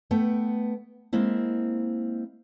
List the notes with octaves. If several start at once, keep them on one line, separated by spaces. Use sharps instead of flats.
A3 B3 G5
G#3 A#3 C4 E4